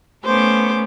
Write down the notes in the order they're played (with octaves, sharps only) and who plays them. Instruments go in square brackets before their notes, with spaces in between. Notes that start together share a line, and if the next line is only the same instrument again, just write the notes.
[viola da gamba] A3 B3 C#4 [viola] C5 D6